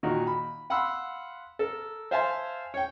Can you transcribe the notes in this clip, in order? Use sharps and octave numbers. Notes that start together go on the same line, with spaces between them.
A#2 D#3 A#3 D#4 F#4
B5
F5 F#5 B5 C6 E6
A4 A#4
C5 E5 F5 G#5 A5 C6
C#5 G5